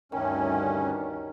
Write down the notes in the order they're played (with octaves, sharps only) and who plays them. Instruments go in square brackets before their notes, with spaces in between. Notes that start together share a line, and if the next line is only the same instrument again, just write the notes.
[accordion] D2 G2 C#4 [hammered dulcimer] D#3